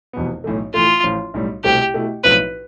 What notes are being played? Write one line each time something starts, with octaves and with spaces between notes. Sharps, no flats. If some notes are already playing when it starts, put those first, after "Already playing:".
F1 E2 B2 B3
B1 A2 E3 A3
A2 E3 A3 F4
A1 A2 F3
B1 A2 G3
C2 B2 A3 C4 G4
B2 A3 E4
B1 A2 F3 C4 E4 B4